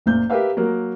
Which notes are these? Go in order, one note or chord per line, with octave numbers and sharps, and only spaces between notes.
F#1 A#2 G6
G4 A#4 B4 E5 F5
F#3 A#3 A#4